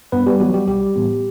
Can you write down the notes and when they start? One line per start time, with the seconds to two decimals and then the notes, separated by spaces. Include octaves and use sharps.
0.12 G2 B3 B4
0.26 G3 G4
0.40 E3 F#3 B3 F#4
0.54 G3 G4
0.67 B1 G3 G4
0.95 A2 E3 G3 B3